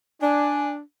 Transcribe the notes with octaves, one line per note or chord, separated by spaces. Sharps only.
D4 G#5